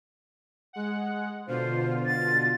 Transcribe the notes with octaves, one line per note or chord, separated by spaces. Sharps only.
G#3 F#5
B2 D3 F4 C5
A6